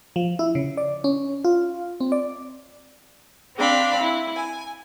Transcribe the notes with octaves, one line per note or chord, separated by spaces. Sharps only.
F3
E4
C#3
D5
C#4
F4
C4
D5
C4 D4 F5 B5
E4
G#5